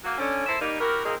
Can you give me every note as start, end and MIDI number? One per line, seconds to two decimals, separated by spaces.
0.04 0.16 54
0.04 0.16 58
0.04 0.16 66
0.18 0.44 50
0.18 0.44 61
0.46 0.56 58
0.46 0.56 64
0.46 0.56 69
0.46 0.56 72
0.46 0.56 76
0.60 0.78 55
0.60 0.78 58
0.60 0.78 63
0.80 1.02 64
0.80 1.02 66
0.80 1.02 67
0.80 1.02 70
1.05 1.14 46
1.05 1.14 58
1.05 1.14 60
1.05 1.14 63
1.05 1.14 68
1.05 1.14 70